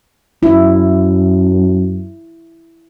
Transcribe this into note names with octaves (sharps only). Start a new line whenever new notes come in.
F#2 E4